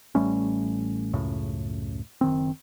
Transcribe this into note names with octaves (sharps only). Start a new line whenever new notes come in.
A1 G3 A3 C#4
C#2 F#2 A2 C#3
F#1 D#3 C4